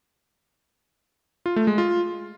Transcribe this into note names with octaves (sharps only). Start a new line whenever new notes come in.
F4
A3
G#3
F4